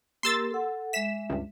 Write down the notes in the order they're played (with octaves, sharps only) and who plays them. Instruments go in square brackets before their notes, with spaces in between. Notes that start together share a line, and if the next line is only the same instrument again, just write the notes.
[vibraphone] A#3 G4 A#4 [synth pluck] C6 E6 A6
[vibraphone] A4 F#5
[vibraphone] G#3 E5 [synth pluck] B6 E7
[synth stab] C#2 G2